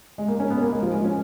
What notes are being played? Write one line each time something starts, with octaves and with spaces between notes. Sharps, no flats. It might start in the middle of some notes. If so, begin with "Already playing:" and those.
G#3
A#3
C#4
B3
A#3
G#3
F3
G#3
C#4